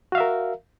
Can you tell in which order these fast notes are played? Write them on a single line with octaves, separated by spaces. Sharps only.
F#4 F5 E5 A#4